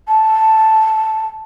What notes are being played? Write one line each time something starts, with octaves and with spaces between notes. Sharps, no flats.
A5